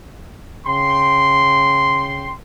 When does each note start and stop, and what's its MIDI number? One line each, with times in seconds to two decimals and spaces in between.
0.67 2.32 49
0.67 2.32 79
0.67 2.32 84